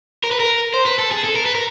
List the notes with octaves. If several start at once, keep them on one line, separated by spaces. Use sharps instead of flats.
A#4
B4
A#4
C5
B4
A4
G#4
A4
A#4
B4
A#4